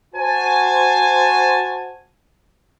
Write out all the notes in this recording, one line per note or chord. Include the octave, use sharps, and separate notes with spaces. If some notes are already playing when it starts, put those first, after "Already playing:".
F#4 C5 G#5 A5